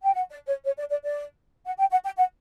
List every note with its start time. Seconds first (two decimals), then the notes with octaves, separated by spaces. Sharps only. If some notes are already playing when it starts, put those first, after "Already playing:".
0.03 G5
0.14 F#5
0.30 D5
0.47 C#5
0.65 C#5
0.78 D5
0.91 D5
1.03 D5
1.66 F#5
1.79 G5
1.91 F#5
2.05 G5
2.17 F#5